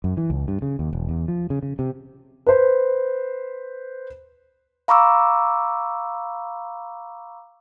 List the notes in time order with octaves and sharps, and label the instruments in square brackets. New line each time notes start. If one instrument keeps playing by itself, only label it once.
[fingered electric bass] F#2
E3
C#2
G2
C#3
D#2
E1
E2
F3
C#3
C#3
C3
[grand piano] B4 C5
[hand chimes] F5 A#5 B5 C#6 D6 E6